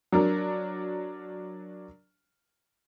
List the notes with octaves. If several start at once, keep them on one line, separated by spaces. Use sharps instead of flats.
F#3 D4 A#4